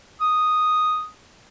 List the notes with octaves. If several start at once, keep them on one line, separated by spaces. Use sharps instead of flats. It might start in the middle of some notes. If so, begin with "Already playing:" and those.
D#6